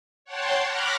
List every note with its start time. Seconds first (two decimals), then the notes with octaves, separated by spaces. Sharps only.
0.25 C#5 F#5 G5 A5 C6
0.65 B5 C#6 D6 F6 F#6 A#6